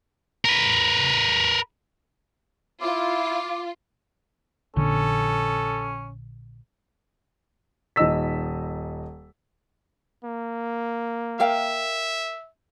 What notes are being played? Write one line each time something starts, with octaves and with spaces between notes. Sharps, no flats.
A#4 B4
E4 F4 D6
A#1 D3 C#4 A4
D#1 D#4 D#5 E6 B6
A#3
A#4 E5 F5 G5